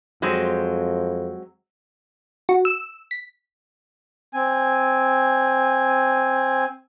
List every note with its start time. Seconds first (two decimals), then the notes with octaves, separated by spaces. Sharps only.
0.22 F2 F#3 G#3 C4
2.49 F#4
2.65 E6
3.11 B6
4.33 C4 G#5